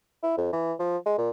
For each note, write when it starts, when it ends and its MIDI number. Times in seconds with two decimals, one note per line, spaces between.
0.23 0.37 64
0.38 0.48 41
0.53 0.73 52
0.80 0.98 53
1.06 1.17 56
1.18 1.30 46